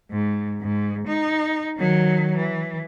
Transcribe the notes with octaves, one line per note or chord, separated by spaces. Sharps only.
G#2
G#2
D#4
D#3 F#3
E3